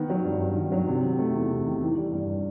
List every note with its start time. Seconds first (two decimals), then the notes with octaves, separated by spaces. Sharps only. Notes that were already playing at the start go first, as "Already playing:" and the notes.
Already playing: D#3 B3
0.10 F#3
0.25 G2
0.40 G2
0.56 D#3
0.72 F#3
0.87 C3
1.04 D#3
1.19 A3
1.34 E2
1.51 C3
1.65 D#3
1.81 E3
1.97 G3
2.12 G2